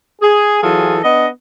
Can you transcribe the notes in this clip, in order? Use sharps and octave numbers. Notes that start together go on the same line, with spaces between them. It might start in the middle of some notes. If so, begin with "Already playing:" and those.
G#4
E3 F#3 F4 G#4 A4
B3 D4 D#5